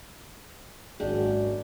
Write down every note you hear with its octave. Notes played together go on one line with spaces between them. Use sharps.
G#1 F#2 G#3 A#3 D4 F#4 G4